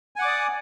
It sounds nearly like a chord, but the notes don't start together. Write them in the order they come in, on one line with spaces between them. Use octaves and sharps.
G#5 F#5 D6 D5 D#6